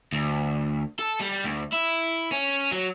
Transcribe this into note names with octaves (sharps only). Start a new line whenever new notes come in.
D2
A4
G3
D2
E4
C#4
F#3